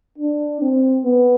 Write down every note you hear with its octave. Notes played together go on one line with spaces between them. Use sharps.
D4
C4
B3